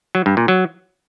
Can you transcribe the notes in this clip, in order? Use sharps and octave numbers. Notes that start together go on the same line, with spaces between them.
F#3
G2
A#2
F#3